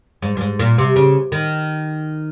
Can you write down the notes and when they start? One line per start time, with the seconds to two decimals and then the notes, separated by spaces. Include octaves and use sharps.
0.22 G#2
0.37 G2
0.41 G#2
0.59 A#2
0.78 C3
0.96 C#3
1.32 D#3